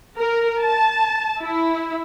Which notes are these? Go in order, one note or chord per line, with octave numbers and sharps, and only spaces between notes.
A#4
A5
E4